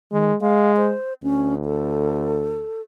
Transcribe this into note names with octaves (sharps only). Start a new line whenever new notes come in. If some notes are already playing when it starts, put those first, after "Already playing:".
D#3 G#3
G#3 F5
C5
D2 C#4
A4